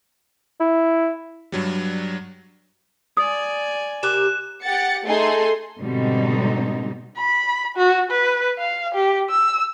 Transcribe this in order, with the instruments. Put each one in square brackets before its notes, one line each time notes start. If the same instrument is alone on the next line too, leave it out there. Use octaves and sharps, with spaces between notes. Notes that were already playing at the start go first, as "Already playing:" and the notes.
[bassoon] E4
[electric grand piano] G2 F#3 G3
[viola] D5 G#5 [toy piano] D#6
[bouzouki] C3 G4 A#4 [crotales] D6 F#6 E7
[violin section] G4 F#5 A6 C#7
A3 D#4 G#4 A4 C6
[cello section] G#2 B2 D3 G3 C4 D#4
[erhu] B5
F#4
B4
F5
G4
E6